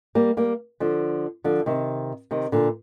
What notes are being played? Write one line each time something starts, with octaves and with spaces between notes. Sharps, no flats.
G3 A#3
G3 A#3
D3 F3
D3 F3
C3 D#3
C3 D#3
A#2 D3